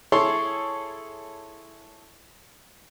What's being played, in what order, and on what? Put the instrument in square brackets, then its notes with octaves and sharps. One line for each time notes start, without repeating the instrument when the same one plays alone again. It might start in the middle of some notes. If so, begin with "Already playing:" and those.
[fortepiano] E4 G#4 A4 C#5 C6 C#6